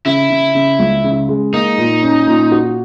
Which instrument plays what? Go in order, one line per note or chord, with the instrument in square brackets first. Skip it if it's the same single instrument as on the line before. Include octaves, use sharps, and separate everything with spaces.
[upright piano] C#3 [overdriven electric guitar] E4
[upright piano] C#3
C#3
C#2
C#3
G#3
[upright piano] A#3 [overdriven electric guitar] D#4
[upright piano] A#2
C#4
A#2
F#4